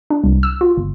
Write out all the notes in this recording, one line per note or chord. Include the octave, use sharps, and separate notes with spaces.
D4
C2
E6
F4
G1